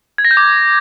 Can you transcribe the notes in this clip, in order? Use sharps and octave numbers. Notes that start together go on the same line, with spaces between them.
G#6
A#6
G6
D6